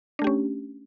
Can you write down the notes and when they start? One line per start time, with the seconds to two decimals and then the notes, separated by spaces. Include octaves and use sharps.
0.19 D4
0.22 A3
0.24 G4
0.27 C#4